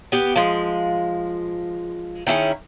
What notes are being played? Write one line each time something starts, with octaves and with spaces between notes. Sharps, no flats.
B3 G4
F3 G#3
D#3 C#4 E4 G#4